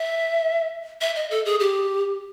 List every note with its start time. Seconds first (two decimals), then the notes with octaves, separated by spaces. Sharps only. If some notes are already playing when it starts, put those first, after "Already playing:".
Already playing: E5
1.01 E5
1.16 D#5
1.31 A4
1.45 G#4
1.60 G4